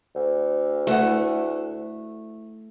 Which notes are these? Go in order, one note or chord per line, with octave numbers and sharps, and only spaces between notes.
D2
A3 E4 B4 F#5